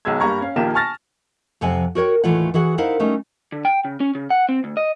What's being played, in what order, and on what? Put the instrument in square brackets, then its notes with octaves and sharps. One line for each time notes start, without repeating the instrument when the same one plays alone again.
[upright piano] B1 D#3 F#3 G#3 E6 G#6
G2 G3 A#3 A#5 C#6 G#6
C#4 F5
A#1 D#3 A#3 F4 G4 E7
G#5 A5 C#6 F6 A6 A#6
[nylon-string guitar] F2 C3 F3 F#5 G#5
F#4 A#4 C#5 G5
D#2 A2 E3 F4 C#5 F#5
E3 F#4 G#4 F#5
D#4 E4 A#4 C5 F5 F#5
G3 A3 C#4 D#4
[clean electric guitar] D3
G5
C#3
C#4
C#3
F#5
C4
D2
D#5